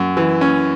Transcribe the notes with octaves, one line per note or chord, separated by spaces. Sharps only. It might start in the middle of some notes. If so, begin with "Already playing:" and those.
Already playing: F#2
E3
C#4